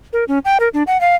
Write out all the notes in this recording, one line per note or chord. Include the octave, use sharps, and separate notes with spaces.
A#4
C#4
G5
A#4
D4
F#5
F5